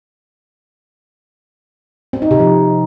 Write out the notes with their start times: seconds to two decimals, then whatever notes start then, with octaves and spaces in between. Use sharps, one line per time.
2.13 C4
2.22 D#4
2.31 C3
2.40 F3